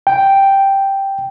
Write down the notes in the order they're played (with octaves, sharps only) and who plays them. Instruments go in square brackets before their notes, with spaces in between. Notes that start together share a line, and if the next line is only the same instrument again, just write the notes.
[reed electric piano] G5